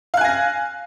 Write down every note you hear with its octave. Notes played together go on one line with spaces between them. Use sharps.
F5 G#5 F#6 A#6